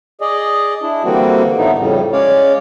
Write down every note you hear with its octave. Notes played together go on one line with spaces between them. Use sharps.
G#4 D5 D#5
D4 E4
D3 E3 G3 A#3 C4 F#4
A2 D3 A3 B3 D#4
F2 A2 C#3 G3
G#3 C#4 C#5 D5 F5